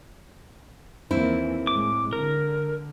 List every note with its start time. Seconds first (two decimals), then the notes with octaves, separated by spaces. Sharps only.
1.11 D#2 E3 A#3 C4 E4
1.67 A2 G#3 D6
2.13 D3 A#4